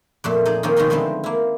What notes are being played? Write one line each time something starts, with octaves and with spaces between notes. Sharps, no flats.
F2 A#2 A3
D#4 G#4 D5
D#3 F3 A#3 C4 C#4
B2 D#3 G#3 C4 C#4 D#4
D3 F3 G#3 A3 B3 C4
A#3 E4